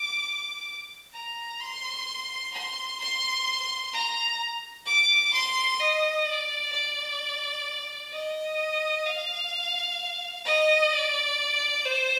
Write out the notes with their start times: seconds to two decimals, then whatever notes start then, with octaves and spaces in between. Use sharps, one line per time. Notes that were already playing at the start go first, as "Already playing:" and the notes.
Already playing: D6
1.13 A#5
1.60 C6
2.53 C6
3.00 C6
3.93 A#5
4.86 D6
5.33 C6
5.80 D#5
6.26 D5
6.72 D5
8.13 D#5
9.06 F5
10.45 D#5
10.92 D5
11.85 C5